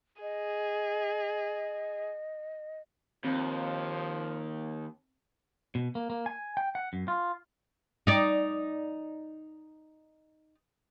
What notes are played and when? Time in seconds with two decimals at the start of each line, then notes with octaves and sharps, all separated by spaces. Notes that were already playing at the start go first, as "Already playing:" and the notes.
0.22 G#4 D#5
3.25 D#2 F3 C4
5.75 B2
5.95 A#3
6.10 A#3
6.26 G#5
6.57 G5
6.75 F#5
6.93 F#2
7.08 F4
8.07 D#4 D5